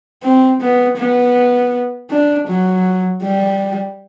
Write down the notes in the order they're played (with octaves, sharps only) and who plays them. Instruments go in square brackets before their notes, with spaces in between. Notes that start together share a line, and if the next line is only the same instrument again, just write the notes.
[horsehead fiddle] C4
B3
B3
D4
F#3
G3